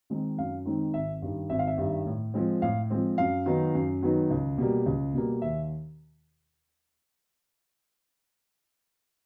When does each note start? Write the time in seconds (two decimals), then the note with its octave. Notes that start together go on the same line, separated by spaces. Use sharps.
0.10 D#3 G#3 C4 D#4
0.38 F#2 F5
0.66 D#3 G#3 C4 D#4
0.94 G#1 E5
1.22 G2 D#3 G3
1.50 G#1 E5
1.59 F5
1.67 E5
1.78 G2 D#3 G3
2.06 A2
2.34 F3 G#3 C4
2.62 A2 F5
2.90 F3 G#3 C4
3.18 F#2 F5
3.46 D#3 F#3 B3 D#4
3.75 F#2
4.02 D#3 F#3 B3 D#4
4.31 C#2
4.58 B2 G3 A#3
4.86 C#2
5.14 B2 G3 A#3
5.42 D#2 E5